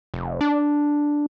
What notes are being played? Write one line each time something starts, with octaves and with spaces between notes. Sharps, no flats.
F1
D4